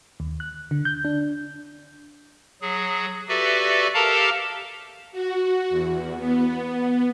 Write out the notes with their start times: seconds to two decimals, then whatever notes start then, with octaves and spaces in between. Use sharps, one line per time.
0.20 D#2
0.40 F#6
0.71 D3
0.85 G6
1.05 D4
2.61 F#3 G#4
3.29 F#4 G4 A4 B4 D5 E5
3.94 G4 A4 A#4 F5 A5 A#5
5.12 F#4
5.70 E2
6.18 B3